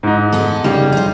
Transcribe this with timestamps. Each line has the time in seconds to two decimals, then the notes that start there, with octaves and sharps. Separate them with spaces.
0.03 G#2 D#4
0.32 B3 A4
0.64 C#3 G3 A#3 D#4
0.92 D#4 C5